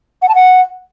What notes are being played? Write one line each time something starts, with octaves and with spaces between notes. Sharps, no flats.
F#5
A5
F#5